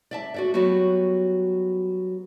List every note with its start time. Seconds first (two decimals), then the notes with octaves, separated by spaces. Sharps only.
0.11 D5 E5 A5
0.34 F#4 D5 E5
0.54 F#3 G3 B3 F#4